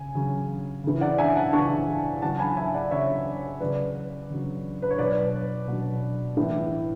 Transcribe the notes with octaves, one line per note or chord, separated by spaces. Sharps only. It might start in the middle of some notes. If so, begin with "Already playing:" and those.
Already playing: C#3 G#5
C#3 F#3
C#3 E3
D5 F#5
E5 G#5
F#5 A5
C#3 E3 A5 C#6
C#3 F#3 F#5 A5
G#5 B5
E5 G#5
D5 F#5
C#3 F#3 C#5 E5
C#3 F#3 B4 D5
C#3 F#3
B4
C#5
B2 F#3 B4 D5
B2 F#3
A2 E3